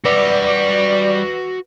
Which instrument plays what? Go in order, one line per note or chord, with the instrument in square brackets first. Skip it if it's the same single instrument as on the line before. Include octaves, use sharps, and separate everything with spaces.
[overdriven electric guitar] G3 [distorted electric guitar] F#4 E5 [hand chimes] B4 [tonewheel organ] D5